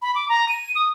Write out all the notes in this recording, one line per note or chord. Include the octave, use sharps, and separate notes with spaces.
B5
D6
A#5
D#7
D#6